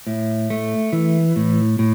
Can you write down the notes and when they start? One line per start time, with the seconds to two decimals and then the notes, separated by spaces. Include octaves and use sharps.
0.07 A2
0.50 A3
0.93 E3
1.36 A2
1.79 A2